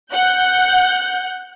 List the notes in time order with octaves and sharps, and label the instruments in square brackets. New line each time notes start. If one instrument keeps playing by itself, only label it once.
[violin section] F#5 F#6 G6